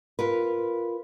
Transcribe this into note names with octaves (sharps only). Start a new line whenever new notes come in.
F4 A#4 B4